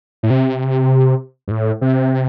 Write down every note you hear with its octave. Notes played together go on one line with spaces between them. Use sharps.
A2
C3
G2
A2
C3